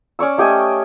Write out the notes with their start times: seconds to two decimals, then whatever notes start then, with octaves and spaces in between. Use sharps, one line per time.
0.19 C#4 D5 C#6 E6
0.38 A3 G4 D#5 G#5